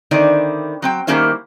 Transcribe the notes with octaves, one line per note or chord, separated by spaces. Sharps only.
D3 D#3 C4 E4 D5
F#3 C4 G5
D#3 G3 A#3 C#4 E4 C5